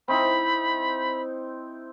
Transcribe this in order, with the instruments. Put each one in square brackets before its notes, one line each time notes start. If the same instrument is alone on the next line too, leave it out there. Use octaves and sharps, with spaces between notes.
[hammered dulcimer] C4 D#4 E4 [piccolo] B5